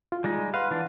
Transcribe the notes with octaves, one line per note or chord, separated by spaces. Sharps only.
F4
G3 G#3 D#4
B4 F5 F#5 C6
E3 D4